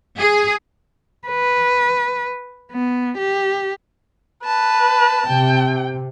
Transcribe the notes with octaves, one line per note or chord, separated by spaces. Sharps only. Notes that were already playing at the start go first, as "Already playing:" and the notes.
G#4
B4
B3
G4
B4 A5
C3 G5